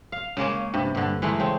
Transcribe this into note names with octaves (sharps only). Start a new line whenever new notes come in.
F5
C#3 G#3 A#3 C#4
G2 C3
G2 D3
E3 G#3 A3 D#4
C#3 C4